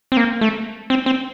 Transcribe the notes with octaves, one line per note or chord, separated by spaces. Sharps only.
C4
A#3
A3
C4
C4